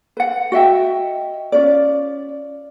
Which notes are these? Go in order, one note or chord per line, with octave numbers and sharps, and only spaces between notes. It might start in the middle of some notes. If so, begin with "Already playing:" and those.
B4 F#5
F#4 D#5 E5 G5
C#4 F4 D5